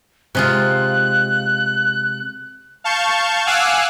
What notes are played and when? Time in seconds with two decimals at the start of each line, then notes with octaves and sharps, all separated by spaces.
0.35 C3 G#3 F4 F#6
2.84 F5 A5 C#6 G6
3.47 F5 F#5 G#5 D6 E6 F#6